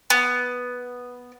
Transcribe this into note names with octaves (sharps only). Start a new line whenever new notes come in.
B3